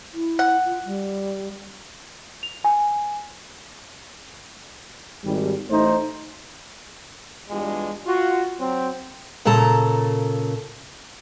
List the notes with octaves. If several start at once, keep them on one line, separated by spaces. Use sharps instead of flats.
E4
F#5
F4
G3
F7
G#5
G#1 G3
A1 A3 D#4 C5
E2 G2 G3 G#3 D4 F4
F4 F#4
F#3 C4
A#2 C#3 A4 A5 A#5